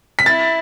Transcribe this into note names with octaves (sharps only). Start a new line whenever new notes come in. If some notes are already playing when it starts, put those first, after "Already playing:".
B6
E4 A6